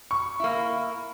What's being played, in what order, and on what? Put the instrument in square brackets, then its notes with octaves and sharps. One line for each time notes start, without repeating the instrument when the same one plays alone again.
[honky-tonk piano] C#6
[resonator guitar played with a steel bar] A#3 E4